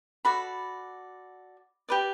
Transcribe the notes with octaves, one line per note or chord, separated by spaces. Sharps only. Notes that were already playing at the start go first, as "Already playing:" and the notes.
F#4 A4 D5 B5
G4 B4 D5